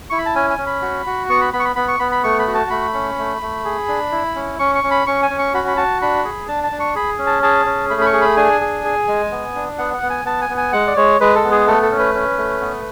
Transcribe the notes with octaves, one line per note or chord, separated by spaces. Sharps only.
E4 C#6
B5
A5
C#4 G#5
G#5
C#4
B5
F#4
F#4
B3 C#6
B5
B3 B5
C#6
B5
B3 B5
C#6
B3 B5
B5
A3 C#6
B5
F#4
A5
A3 B5
C#4
A3
A3
G#4
D4
E4
C#4
C#4 C#6
C#6
C#4
B5
C#4 C#6
G#5
C#4
C#6
F#4 B5
B5
F#4 A5
D4 B5
G#4
D4 A5
A5
D4
C#6
G#4 B5
C#4
A5
G#4 A5
C#4
A3 B5
B5
C#6
G#4
B5
D4 G#5
G#4
G#4
G#3
B3
D4
B3 F#5
F#5
B3
G#5
B3 A5
G#5
B3
G#5
G#3 F#5
D5
G#3 C#5
G#3 B4
A4
B3
G#4
A3 A4
A4
C#4
B4
C#4
A3
B3